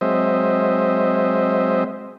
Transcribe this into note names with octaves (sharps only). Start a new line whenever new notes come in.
F#3 G#3 C4 C5 D#5 E5